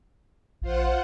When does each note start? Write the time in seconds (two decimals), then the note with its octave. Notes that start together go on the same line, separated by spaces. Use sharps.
0.62 A#1 F4 C5 F#5